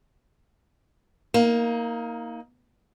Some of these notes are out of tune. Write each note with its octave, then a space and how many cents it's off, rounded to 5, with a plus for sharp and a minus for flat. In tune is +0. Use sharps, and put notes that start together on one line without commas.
A#3 +0 D#4 +30